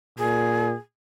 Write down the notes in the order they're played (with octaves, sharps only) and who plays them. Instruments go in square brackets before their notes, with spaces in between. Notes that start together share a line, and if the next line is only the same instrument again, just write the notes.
[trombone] A#2 [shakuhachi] G#4